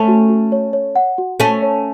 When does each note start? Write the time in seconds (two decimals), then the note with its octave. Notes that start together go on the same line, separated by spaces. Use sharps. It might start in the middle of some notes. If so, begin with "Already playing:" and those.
Already playing: A3 C#4
0.08 F#4
0.29 F#4
0.52 C#5
0.73 C#5
0.96 F#5
1.18 F#4
1.40 A3 C#4 A4
1.62 C#5